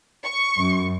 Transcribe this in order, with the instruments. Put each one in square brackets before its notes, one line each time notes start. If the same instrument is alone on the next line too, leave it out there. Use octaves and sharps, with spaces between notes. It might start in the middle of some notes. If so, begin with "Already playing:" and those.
[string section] C#6
[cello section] F#2